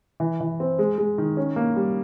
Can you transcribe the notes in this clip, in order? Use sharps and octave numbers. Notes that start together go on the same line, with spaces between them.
E3
E3
C4
G#3
G#3
D#3
C#4
A#3
G3